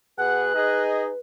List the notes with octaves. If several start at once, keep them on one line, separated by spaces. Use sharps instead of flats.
B2 G#4 B4 F#5 F#6
D#4 G#4 D#5